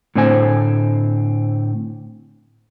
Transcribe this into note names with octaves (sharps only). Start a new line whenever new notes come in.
A2 D3 C4 C5 G#5